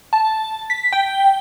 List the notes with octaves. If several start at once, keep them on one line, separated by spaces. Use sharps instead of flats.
A5
B6
G5